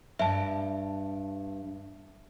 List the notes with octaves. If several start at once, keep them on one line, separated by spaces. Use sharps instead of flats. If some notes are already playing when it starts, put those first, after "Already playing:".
G2 E5 A5